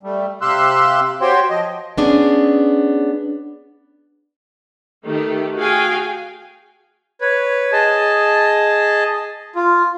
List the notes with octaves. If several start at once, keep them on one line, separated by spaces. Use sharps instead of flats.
G3 A3
C3 G4 F5 C6 E6 F#6
F#4 G4 C5 C#5 G5 C6
F3 D#5
B3 C#4 D4 G#4
D#3 A3 G4
F#4 G#4 F5 G5 G#5
B4 C#5
G#4 D#5 A5
F4